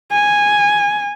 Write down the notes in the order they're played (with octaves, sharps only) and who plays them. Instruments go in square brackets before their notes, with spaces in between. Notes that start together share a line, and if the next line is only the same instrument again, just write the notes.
[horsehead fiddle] G#5